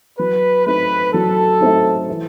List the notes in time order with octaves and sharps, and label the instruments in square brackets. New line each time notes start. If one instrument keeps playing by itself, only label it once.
[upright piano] F#3 [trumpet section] B4
[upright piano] A3 C4 D#4 [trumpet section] B4
[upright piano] F#3 [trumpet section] A4
[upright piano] A3 C4 D#4
E3